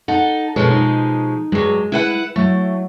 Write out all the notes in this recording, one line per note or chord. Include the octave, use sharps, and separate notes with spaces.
D#4 A4 F#5
B2 F3 G#3 A4 B4 C#5
D#4
G2 F#3 G#3
E4 B4 F#5
F#3 A3 E4